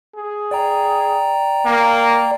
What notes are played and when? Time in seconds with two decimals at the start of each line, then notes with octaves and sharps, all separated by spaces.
0.16 G#4
0.51 D5 G5 A#5
1.66 A#3